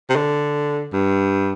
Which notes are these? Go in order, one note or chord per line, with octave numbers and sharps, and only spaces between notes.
C3
D3
G2